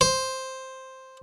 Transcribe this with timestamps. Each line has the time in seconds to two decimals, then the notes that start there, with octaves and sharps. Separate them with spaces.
0.01 C5